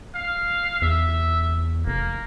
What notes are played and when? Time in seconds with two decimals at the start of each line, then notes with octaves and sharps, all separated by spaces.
0.15 F5
0.82 E2 E5
1.87 F1 A#3